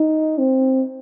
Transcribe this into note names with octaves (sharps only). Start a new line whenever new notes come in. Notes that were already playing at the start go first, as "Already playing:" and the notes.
Already playing: D#4
C4